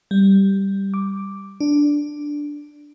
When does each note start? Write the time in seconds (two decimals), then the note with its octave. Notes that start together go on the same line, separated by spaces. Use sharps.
0.11 G3
0.94 D6
1.60 D4